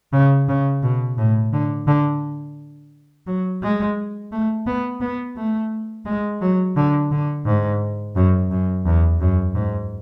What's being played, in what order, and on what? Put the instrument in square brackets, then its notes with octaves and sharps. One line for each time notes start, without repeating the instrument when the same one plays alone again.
[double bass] C#3
C#3
B2
A2
D3
D3
F#3
G#3
A3
B3
B3
A3
G#3
F#3
D3
D3
G#2
F#2
F#2
E2
F#2
G#2